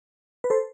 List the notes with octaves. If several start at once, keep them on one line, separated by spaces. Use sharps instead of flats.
B4
A4 C5